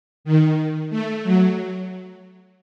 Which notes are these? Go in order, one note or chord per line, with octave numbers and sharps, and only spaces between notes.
D#3
A3
F#3